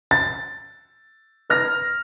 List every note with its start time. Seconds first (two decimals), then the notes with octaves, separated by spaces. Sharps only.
0.11 A6
1.50 B4 F6 A#6